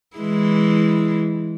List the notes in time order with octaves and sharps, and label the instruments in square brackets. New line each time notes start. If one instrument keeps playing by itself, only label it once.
[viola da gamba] E3 G#3 E4